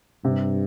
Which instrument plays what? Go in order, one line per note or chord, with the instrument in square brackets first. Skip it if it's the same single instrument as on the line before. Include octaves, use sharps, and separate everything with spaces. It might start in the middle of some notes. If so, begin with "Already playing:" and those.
[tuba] G2 [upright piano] C3